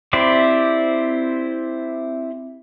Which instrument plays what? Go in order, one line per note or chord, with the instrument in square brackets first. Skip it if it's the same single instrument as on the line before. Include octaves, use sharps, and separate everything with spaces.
[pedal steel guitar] C4 E4 G4 C5 D5